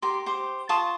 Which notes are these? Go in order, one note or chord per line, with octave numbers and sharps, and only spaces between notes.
G4 A#4 C6
G4 C5
F4 A5 C#6 D#6